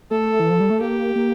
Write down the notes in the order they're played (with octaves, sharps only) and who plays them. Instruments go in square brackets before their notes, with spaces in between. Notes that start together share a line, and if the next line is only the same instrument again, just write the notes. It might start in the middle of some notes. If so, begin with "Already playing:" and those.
[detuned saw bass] A3 [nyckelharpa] A4
[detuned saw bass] E3
F3
G3
A3
[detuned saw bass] A#3 [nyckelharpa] G4
[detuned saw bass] A#3